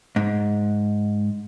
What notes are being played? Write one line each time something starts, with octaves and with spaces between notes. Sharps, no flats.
G#2